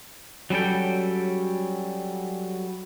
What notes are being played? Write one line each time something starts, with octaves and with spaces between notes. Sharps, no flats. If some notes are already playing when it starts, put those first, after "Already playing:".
F#3 G3 C#4 A4 G5